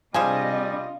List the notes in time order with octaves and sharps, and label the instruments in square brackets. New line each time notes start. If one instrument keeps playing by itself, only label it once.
[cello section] C3 D4 D#5 [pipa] F3 G#4 G#5 [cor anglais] G3 [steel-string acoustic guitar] F4